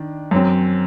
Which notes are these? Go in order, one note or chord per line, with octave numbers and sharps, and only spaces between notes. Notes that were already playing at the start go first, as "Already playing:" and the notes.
Already playing: D#3 D4
F#2 F#3 C4